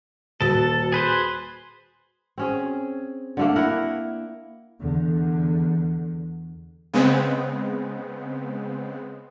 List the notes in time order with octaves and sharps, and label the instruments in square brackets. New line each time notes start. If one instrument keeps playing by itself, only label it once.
[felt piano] D#1 A6 [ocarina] F#4 [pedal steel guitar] A4
[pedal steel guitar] G#4 B4 C5
[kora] C4 C#4 G#4
D3 A3 A#3
E4 A#4 F#5
[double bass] E2 D3
[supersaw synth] C#3 G#3 B3 C4